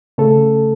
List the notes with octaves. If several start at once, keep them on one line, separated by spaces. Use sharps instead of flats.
C#3 A3 A4